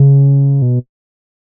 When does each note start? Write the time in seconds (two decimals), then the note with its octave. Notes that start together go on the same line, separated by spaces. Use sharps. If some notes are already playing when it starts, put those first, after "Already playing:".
Already playing: C#3
0.62 B2